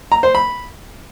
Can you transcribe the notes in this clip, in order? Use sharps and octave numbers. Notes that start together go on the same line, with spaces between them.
A#5
C5
B5